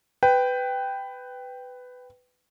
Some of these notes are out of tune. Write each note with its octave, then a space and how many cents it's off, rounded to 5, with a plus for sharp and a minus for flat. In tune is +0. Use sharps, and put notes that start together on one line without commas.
B4 +15 G5 +0